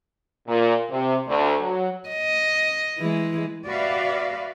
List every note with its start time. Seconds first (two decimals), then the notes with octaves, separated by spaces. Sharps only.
0.48 A#2
0.91 C3
1.28 D2
1.61 F#3
2.09 D#5
2.99 E3 G#3
3.66 F#4 G4 B4 D5 E5 F5